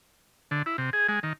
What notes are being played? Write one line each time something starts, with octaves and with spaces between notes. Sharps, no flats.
D3
E4
C3
G#4
G#3
D#3